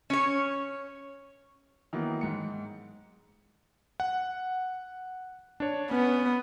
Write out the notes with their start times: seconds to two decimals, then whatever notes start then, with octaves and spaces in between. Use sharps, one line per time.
0.10 C#4 C#5
1.93 D#3 E3 F#3 A#3 B3
2.21 G#2 C#7
4.00 F#5
5.60 D4 C#5
5.91 B3 C#4